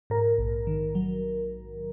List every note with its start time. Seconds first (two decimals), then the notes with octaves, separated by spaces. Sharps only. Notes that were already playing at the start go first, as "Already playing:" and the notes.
0.10 G#2 A#4
0.38 A#1
0.67 D#3
0.95 F#3